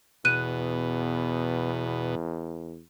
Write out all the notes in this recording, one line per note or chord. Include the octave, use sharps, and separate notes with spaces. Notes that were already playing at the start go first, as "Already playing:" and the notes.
E2 B2 F#6 D#7